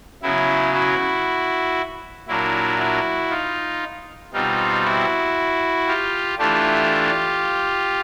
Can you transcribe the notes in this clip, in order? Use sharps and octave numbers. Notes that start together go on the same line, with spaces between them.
C#3 F#3 B3 E4
E4 F#4
A#2 F#3 A#3 D4 E4
E4 F#4
D#4 F4
B2 G3 C4 D#4 F4
E4 F#4
F4 G4
E3 A3 D4 F4 G4